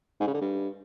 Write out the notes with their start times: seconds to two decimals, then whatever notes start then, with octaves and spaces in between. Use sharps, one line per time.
0.20 G#2
0.27 C#3
0.34 D3
0.41 G2